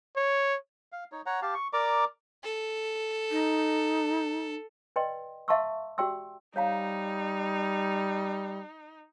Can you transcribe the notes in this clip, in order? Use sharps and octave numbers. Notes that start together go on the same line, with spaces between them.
C#5
F5
D#4 C#5
C#5 F#5 A#5
G4 F5 A5
C#6
A#4 D5 A#5 D6
A4
D#4
B4 D5 D#5 G5 C6
E5 F5 A5 C6 C#6 E6
F#4 G4 D5 G5 C6 E6
G3 D#4 C#5 F5 A#5